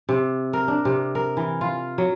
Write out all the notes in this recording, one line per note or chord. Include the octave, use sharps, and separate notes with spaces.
C3
A#4
D4
C3
A#4
E3
F4
F#3